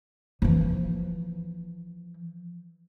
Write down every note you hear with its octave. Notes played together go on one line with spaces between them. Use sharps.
E3 F3